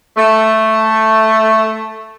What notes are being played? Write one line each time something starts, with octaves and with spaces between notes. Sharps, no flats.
A3